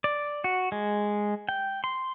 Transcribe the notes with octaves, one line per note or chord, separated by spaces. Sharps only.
D5
F#4
G#3
G5
C6